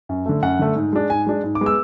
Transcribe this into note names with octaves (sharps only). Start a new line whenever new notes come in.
F#2
D3 A3
F#2 F#5
D3 A3
G#2
G#3 D4
G#2 G#5
G#3 D4
G#2
D6
G#3 B3
E6